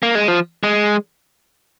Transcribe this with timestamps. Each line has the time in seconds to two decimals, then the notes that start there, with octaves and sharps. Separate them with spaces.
0.03 A#3
0.15 G#3
0.28 F3
0.63 G#3